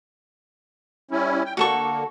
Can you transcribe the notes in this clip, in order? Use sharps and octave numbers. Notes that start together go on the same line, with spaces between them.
G3 C#4 E4
G5
D3 A#3 F#4 A4 C#6